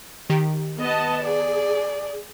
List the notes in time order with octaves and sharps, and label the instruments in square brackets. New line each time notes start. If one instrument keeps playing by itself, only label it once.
[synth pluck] D#3 G4
[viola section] B3 D#5 A5
[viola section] G#4 [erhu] D5